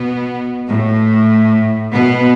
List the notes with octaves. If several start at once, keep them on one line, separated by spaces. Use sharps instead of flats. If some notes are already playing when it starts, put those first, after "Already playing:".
Already playing: B2 B3
A2 A3
B2 B3